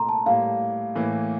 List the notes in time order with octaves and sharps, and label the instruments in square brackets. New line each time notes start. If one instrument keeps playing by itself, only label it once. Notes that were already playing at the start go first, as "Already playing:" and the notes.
Already playing: [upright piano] C2 A#2 A3 [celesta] A#5 C6
[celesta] A5
[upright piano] A2 G3 A#3 [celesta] F5
[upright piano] A2 E3 A#3